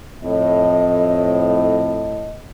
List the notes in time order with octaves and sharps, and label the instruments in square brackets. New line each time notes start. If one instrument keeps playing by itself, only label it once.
[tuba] F2 [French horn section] A2 D#5